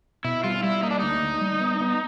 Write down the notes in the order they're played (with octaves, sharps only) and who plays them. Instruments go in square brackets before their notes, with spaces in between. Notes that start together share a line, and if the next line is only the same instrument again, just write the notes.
[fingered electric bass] B2 [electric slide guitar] E4
[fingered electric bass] G3 [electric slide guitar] F4
[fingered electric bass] G3 [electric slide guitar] E4
[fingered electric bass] A#3 [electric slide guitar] D#4
[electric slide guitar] D4
[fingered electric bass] D2 [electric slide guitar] D#4
[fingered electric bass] D2
G3
B3
B3